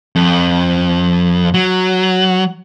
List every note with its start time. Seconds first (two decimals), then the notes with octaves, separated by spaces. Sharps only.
0.16 F2
1.54 F#3